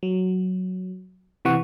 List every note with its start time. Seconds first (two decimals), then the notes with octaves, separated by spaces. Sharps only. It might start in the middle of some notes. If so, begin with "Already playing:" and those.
0.03 F#3
1.45 C3 E3 F#5 C#6